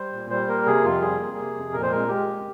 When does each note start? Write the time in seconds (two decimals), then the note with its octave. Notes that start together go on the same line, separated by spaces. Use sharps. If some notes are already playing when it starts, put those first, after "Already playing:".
Already playing: G3 C5
0.13 A#2
0.30 G3 C5
0.48 A#3 A#4
0.66 C3 G#4
0.84 F2 F4
1.01 G3 G#4
1.19 A#3
1.37 C3
1.55 F2
1.73 A#2 A#4
1.83 C5
1.91 G#3 A#4
2.08 G#3 G4
2.27 A#2